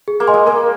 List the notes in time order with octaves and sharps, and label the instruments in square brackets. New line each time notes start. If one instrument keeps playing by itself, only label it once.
[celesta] G#4
[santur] A#3
[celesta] D#5 G#5 C6
[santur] G#3
[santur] A#3 [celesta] A#4